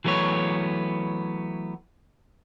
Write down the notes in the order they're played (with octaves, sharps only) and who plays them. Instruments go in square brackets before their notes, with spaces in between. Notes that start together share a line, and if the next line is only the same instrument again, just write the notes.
[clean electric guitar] E3 F#3 A3 B3 C#5